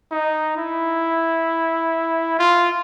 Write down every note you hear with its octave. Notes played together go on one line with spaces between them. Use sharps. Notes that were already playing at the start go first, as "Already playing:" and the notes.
D#4
E4
F4